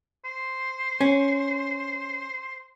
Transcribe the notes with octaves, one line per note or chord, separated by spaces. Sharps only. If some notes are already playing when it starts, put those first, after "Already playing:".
C5
C#4